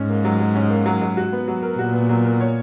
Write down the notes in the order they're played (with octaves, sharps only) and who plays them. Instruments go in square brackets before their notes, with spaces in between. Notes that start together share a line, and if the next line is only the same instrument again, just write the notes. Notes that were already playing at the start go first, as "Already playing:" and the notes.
Already playing: [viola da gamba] G#2 [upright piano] C#4
[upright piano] A#3
F#3
F#3
C#4
A#3
F#3
F#3
F#4
B3
F#3
A#4
[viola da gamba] A#2 [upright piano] F#4
[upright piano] B3
F#3
A#4
C#5